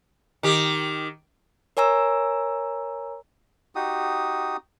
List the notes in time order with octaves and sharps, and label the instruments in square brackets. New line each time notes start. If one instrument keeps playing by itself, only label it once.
[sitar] D#3 G4
[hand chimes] A#4 C#5 G#5 A#5 E6
[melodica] D#4 F#4 G4 D#6